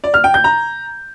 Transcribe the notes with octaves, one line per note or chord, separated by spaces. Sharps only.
D5
F6
G5
G6
A#5